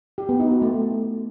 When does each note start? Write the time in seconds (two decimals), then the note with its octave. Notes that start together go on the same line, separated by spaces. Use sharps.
0.18 G4
0.29 B3
0.40 D#4
0.51 F#4
0.62 A3